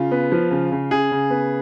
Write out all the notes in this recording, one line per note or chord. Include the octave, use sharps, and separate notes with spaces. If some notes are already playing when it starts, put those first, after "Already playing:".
Already playing: C#3 F4
B3
F3
C#3
C#3
C#3 G#4
C#3
B3